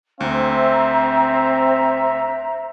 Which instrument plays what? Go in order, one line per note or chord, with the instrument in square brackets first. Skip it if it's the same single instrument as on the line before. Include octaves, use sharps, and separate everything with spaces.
[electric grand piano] D2 [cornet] C4 [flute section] C5 A#5 [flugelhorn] E5